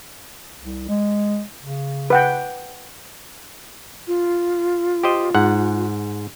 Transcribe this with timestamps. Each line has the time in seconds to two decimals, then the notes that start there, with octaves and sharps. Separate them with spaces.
0.62 C2
0.89 G#3
1.61 C#3
2.10 B4 F#5 G5
4.08 F4
5.03 G4 C5 D#5
5.34 G#2 F#5